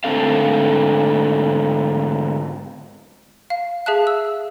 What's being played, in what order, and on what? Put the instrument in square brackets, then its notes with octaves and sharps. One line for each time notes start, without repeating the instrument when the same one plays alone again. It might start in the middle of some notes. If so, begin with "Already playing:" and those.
[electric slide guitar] G#2 D3 A3 C4 A4 F5
[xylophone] F5
G#4 E5 F5 A5 F#6
E6